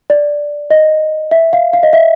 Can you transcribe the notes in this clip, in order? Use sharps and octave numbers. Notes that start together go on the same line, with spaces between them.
D5
D#5
E5
F5
F5
D#5
E5